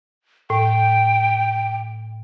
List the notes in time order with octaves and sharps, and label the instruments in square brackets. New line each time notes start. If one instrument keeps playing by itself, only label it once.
[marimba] A2 [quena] G5